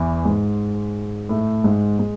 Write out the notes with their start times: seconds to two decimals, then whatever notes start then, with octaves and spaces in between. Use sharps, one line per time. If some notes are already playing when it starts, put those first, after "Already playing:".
Already playing: E2 E3
0.25 G#2 G#3
1.29 A2 A3
1.64 G#2 G#3
1.99 G#3